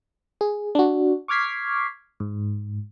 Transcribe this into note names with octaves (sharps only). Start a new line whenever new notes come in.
G#4
D4 F#4
C#6 D6 F6 G#6 B6 C7
G#2